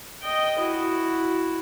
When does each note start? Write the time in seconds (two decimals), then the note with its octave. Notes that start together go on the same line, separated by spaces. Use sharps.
0.22 D#5 G5
0.60 E4 F#4